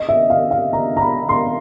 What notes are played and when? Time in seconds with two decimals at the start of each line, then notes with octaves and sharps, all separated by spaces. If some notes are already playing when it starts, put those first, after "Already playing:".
Already playing: D#5
0.09 E5
0.30 F5
0.51 F5
0.73 A#5
0.97 A#5
1.01 B5
1.29 C6